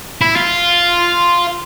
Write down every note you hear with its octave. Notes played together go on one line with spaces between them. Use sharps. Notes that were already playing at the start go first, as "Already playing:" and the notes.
E4
F4